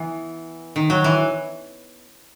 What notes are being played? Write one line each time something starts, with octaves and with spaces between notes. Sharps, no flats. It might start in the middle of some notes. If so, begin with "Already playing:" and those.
Already playing: E3 B3
D#3
F#3
E3